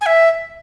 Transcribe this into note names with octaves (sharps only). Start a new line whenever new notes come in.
G#5
E5